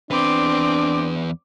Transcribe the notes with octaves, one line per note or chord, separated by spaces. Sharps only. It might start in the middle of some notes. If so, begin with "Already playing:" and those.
E2 C4 D4 B4 D6